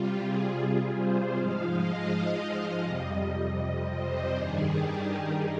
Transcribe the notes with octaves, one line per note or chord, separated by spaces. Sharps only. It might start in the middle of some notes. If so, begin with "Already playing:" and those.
Already playing: C3 G3 F4
G#4
G#4
C5
G#2 F3 G#3 F5
D#5
F5
F5
F2 C3 G3 D#5
C5
G2 D#3 G3 G#4
G4
D#4